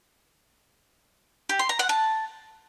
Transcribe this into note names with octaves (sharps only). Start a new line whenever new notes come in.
G4
C6
A#5
F#5
A5